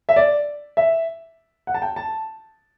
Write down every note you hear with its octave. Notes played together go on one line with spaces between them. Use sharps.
E5
D5
E5
F#5
A5
G5
A5